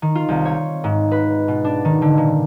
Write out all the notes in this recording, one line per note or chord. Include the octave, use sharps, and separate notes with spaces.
D#3
F4
C2
C#5
G#2
B4
B2
D4
D#3
D3
A#2